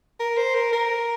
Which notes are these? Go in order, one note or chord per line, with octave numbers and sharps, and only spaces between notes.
A#4
C5
A#4
A#4